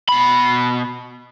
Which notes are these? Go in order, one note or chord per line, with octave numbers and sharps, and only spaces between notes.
B2 B5